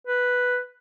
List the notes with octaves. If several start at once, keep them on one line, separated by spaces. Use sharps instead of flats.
B4